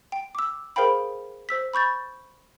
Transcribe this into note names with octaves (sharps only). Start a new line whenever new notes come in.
G5
D6 E6
G#4 A#4 C5 F5 G5 B5
C5 E6 B6
B5 C#6 G6 A6